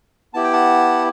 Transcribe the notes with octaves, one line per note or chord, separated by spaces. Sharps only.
B3 E4 G4 A5
G5
F#5 A5